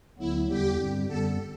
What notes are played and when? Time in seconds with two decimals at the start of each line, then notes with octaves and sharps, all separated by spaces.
0.18 D2 D3 F#3 B3 E4
0.48 E2 D3 G3 B3 G4
0.78 G2 D3 G3 C4
1.08 F#2 D3 G3 B3 A4